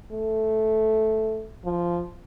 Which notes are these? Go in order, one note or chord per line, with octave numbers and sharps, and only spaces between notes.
A3
F3